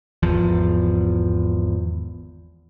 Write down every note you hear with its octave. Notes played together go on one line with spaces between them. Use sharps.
G#1 E2 F3